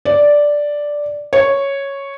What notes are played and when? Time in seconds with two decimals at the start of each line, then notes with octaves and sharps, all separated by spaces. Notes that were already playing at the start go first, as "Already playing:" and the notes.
0.05 D5
1.33 C#5